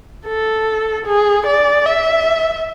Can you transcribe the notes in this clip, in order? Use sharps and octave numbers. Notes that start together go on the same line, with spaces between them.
A4
G#4
D5
E5